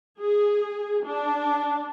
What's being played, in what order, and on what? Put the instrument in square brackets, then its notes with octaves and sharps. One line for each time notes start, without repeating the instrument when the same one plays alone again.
[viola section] G#4
D4